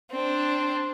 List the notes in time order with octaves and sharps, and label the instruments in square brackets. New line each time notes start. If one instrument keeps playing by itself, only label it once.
[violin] C4 D4